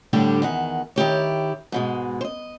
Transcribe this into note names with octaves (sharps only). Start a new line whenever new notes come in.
A2 D3 G3 D4 G4
E2 D#3 F#5
D#3 E4 G4 C#5
G#2 B2 G#3
C5 D#5